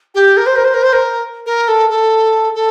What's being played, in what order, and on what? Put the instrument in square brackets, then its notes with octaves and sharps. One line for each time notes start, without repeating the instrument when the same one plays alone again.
[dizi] G4
A#4
C5
A#4
C5
A#4
C5
A#4
A#4
A4
A4
A4